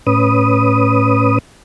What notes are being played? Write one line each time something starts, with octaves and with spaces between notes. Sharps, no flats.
A2 C#4 B4 D#6